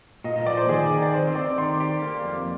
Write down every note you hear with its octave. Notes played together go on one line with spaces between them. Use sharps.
A#2 D#5
D#5
F3 D5
C5
D#3 G#4
D#3
D5
C4 C5
C4 D5
D#3 C6
G4
A#3
F2